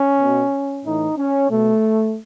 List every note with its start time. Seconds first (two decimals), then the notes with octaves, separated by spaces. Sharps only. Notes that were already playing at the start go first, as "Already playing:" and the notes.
Already playing: C#4
0.20 B2
0.85 A2 E3 D#4
1.17 C#4
1.49 B2 A3